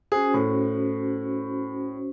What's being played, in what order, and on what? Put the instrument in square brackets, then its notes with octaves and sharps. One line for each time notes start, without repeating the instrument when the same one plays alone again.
[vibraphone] C#4 F#4 C5 [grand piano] G#4
[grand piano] A2